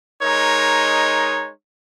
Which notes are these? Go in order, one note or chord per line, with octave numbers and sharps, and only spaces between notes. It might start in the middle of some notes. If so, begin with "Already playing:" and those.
G#3 D#4 A#4 C#5